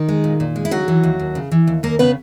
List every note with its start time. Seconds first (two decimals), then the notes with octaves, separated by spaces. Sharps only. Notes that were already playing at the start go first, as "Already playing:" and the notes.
Already playing: D#3 D#4
0.09 G#3
0.24 A#2
0.40 A#2
0.56 G#3
0.65 E4
0.71 C#3 F#3 F#4
0.88 E3
1.03 D#2
1.19 D#2
1.35 C#3
1.51 E3
1.67 D#2
1.83 D#2 A#3 A#4
1.99 C#3 B3 B4